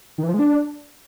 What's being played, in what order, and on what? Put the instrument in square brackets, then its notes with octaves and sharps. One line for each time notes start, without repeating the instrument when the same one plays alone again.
[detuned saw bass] D#3
E3
F3
G#3
D4